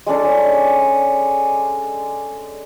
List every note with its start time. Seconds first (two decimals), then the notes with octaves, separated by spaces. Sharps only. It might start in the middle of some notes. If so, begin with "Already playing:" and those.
0.06 G#3 C#4 D4 A4